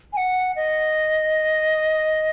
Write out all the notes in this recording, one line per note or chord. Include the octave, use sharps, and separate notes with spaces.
G#5
F#5
D#5